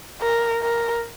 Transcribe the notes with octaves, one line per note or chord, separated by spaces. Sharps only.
A#4
A#4